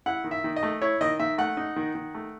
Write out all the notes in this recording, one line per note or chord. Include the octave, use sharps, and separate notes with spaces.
E4 F#5
D#3
E5
D#3
D#5
A3
E4 C#5
D#3 D#5
D#3 E5
A3 F#5
D#4
D#3
D#3
A3